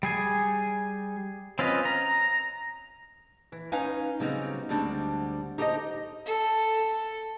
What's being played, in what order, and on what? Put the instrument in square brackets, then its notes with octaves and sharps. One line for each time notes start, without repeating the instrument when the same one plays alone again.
[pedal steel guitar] G3 G#4 G#5
C4 C#4 F4 B4 D#5
A#5
[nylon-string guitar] E3
C#4 D#4 B4 F5 G#5
C#3 F#3 G3 B3 C4 D#4
D2 D3 G3 G#3 C4 D4
D#4 G4 A4 C5 D5 D#5
[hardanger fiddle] A4